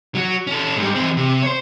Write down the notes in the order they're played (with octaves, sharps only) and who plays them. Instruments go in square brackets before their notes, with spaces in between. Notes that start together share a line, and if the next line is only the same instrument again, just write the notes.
[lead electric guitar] F#3 F#4
C#4 A4
G#2 G3
E3 C4
C3
C5 C#5